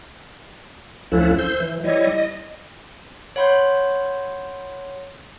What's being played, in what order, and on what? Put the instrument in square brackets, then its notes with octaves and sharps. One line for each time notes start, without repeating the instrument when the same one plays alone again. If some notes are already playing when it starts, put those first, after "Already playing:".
[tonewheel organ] D2 F3 C#4 E4 A4 F#6
C5 E6 G6
E3
G3 E4 C#5 D#5
D#5
[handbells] C#5 F#5 B5 C6 G6